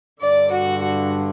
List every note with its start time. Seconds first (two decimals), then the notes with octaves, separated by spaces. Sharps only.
0.21 G2 D3 D5
0.51 F#4
0.81 F#4